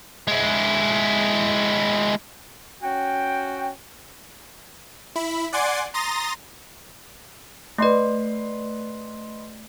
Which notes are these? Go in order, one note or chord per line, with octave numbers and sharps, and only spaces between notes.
G#3 E4
C#4 F#4 G5
E4 B5
D5 F#5 G#5 C6 D6
A#5 C6 D#6 A6 A#6
A3 B4 D5 D#5 C6